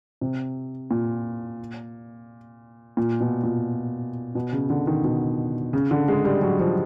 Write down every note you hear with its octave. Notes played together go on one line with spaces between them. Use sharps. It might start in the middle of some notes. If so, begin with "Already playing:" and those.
C3
A#2
A#2
B2
A#2
B2
C#3
D3
D#3
B2
C#3
D3
G#3
G3
F#3
F3